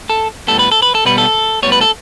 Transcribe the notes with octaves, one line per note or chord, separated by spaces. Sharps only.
A4
A2 G3 B3 A4
B4
A4
B4
A4
B2 G3 B3 B4
A4
A2 G3 B3 C#5
B4
A4